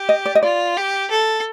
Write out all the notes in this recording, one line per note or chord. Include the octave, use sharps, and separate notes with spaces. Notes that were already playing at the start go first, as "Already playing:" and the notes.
Already playing: G4
D#5
D5
D#5
F4 D5
G4
A4